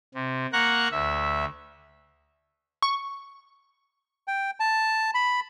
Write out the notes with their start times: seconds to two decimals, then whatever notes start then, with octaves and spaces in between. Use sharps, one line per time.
0.14 C3
0.53 A#3 F#5 A#5 C#6 F#6
0.91 D2 E5
2.82 C#6
4.28 G5
4.60 A5
5.14 B5